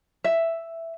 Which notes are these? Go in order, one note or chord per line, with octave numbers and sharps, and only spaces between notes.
E5